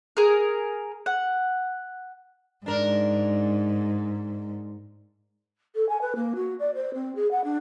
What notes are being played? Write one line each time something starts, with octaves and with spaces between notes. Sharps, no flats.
G#4 A#4
F#5
G#2 D4 A#4
A4
G#5
B4
A#3
F#4
D5
C5
C4
G#4
F#5
D4